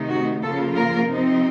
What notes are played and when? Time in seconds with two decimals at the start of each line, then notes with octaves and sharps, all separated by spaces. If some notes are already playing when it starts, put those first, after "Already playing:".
Already playing: C3 D#3 A3 D#4
0.09 F#4
0.42 C#3 F3 A#3 F4 A4
0.75 A#4
1.08 C3 F3 C4 D#4